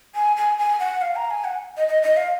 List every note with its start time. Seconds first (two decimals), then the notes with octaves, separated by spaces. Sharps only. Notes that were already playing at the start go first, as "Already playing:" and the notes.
0.15 G#5
0.37 G#5
0.58 G#5
0.80 F#5
1.02 F5
1.16 A#5
1.31 G#5
1.45 F#5
1.77 D#5
1.88 D#5
2.03 D#5
2.17 F5